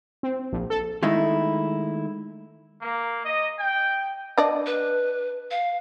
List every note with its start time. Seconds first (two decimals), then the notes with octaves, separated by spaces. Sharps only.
0.23 C4
0.52 A#1
0.70 A4
1.03 D#3 G#3 A3 D#4 E4
2.82 A#3
3.25 D#5
3.59 G5
4.38 D4 D5 D#5
4.66 B4
5.51 F5